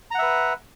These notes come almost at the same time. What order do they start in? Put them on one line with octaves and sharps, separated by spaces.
A#5 F#5 E5 B4